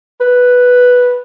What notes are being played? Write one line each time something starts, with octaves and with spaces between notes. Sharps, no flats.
B4